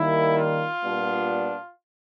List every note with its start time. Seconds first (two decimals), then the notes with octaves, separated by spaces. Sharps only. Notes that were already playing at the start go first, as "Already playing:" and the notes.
Already playing: D#3 G3 A#3 E4
0.38 F4
0.84 A#2 G3 B3 D4